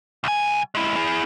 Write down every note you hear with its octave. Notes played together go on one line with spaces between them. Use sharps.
C2 G#5
G#3 E4
E4 G#4